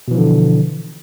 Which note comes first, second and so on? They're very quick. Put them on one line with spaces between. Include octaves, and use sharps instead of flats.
B2 E3 F3 D3